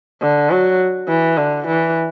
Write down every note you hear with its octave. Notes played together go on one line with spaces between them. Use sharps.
D3
F#3
E3
D3
E3